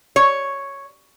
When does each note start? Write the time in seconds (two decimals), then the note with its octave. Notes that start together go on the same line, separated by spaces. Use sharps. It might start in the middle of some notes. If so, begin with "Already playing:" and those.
0.16 C#5